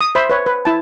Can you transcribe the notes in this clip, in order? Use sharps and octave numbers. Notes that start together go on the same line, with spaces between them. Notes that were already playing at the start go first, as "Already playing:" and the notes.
D#6
C5 E5 B5
B4 C#5
B4
E4 A5